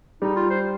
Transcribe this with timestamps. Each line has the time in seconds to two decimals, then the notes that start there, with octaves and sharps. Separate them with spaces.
0.22 G3 D#4
0.36 F4
0.50 C5